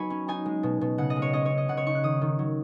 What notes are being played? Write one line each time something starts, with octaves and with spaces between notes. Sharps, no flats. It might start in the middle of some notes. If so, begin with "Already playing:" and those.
Already playing: F#3 B3 D#4 G#5 B5 C#6
C#4
D#4 G#5
G#3
B2
B2
C#3 F#5
D#5
G#3
C#5
C#4 D#5
C#5
C#4
D#5
C#3 F#5
C#5
D#4 C#6
F#6
D#3 D#6
D#3
F#3